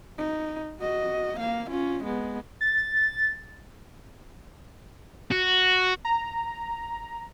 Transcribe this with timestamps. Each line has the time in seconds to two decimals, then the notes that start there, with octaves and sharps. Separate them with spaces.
0.18 D#4
0.80 F#4 D#5
1.38 A#3 F5
1.70 C#4 F4
2.04 G#3 B3
2.61 A6
5.31 F#4
6.05 A#5